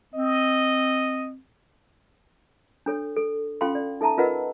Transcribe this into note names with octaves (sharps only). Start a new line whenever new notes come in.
C4 D#5
D4 A4 C#5
A4
C#4 F4 A4 F5 G5 C6
D5
D#4 A4 E5 A5 A#5
F4 A#4 B4 D#5 F#5 E6